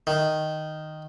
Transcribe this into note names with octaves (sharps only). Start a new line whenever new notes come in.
D#3